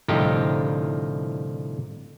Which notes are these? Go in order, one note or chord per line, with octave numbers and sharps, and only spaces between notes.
C2 A2 D3 F3 D#4 G4